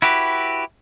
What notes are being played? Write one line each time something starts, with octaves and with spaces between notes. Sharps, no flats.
E4 F#4 G4 B4